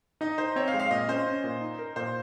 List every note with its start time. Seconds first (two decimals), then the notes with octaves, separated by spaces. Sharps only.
0.21 D#4 D#5
0.38 D#4 C5
0.56 C4 C#5
0.68 F5
0.74 G#3
0.80 F5
0.91 A#2 D#5
1.08 C#4 C5
1.26 C#4
1.44 A#2
1.61 D#4
1.78 A#4
1.96 A#2 C5